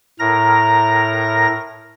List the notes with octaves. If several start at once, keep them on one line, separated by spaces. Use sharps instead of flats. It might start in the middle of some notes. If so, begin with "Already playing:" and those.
A2 A#4 A#5 A#6